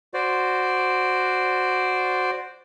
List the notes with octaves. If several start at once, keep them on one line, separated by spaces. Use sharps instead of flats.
F#4 C5 D5